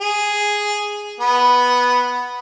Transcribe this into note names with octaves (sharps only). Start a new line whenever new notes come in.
G#4
B3